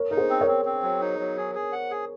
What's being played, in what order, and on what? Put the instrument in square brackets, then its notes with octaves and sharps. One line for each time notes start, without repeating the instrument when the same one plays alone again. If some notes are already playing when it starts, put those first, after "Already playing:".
Already playing: [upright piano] A#4 C#5
[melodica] D#4 [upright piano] A#4
[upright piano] G#4 C5
[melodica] C4
[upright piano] A#4 C#5
[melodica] C4
C4
F#3
D#4
F#3
G#4
G#4
F#5
G#4